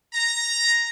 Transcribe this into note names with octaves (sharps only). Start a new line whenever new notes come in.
A#5